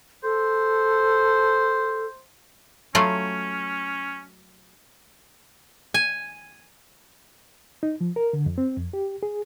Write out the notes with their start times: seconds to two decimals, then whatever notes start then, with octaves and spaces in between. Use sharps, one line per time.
0.23 A4 C5
2.95 F#3 A3 C#4 F4
5.94 G#5
7.83 D#4
8.01 F3
8.16 A#4
8.33 D3
8.46 F2
8.58 C4
8.77 F2
8.93 G4
9.23 G#4